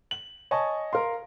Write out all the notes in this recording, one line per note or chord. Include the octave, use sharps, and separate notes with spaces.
F#7
C#5 D#5 G#5 A5 C#6
A#4 F5 C6